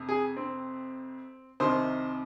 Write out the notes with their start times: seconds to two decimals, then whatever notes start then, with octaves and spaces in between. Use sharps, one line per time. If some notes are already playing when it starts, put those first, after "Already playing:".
Already playing: F2 C3
0.09 G#4
0.37 C4
1.60 C2 C3 D#3 C5